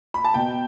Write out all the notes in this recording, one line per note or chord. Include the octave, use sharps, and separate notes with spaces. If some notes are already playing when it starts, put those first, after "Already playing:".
B5
A5
B2 G5